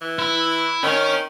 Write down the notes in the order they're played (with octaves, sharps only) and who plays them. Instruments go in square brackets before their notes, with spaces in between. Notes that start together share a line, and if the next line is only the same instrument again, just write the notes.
[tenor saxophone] E3
[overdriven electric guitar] E4
[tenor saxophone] D#3 [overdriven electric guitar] C#4 C#5